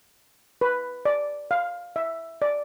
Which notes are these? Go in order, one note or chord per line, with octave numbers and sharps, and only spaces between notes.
B4
D5
F5
E5
D5